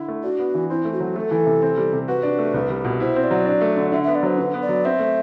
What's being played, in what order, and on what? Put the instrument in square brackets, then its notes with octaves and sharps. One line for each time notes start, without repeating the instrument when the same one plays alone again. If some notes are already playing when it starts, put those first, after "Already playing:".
Already playing: [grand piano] D3 E4
A3
[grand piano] D4 [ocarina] F#4
[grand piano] B3
E3
[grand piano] C4 [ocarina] E4
[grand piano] A3
[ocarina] F#4
[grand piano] F#3
[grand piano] A3 [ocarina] A4
[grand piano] E3
C3
C4
G3
C3
[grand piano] F#4 [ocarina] B4
[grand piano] D4
A3
C2
G3
B2
[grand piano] E4 [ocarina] C5
[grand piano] C4
[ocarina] D5
[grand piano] F#3
D4
A3
D3
[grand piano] D3 [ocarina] E5
[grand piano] B3 [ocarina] E5
[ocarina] D5
[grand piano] F#3 [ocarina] C5
[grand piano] D3 [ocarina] B4
[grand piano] B3
[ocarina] D5
[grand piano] F#3
[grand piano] C4 [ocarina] E5
[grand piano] A3